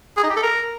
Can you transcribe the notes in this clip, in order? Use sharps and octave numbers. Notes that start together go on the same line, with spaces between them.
G#4
D#4
G4
A4
A#4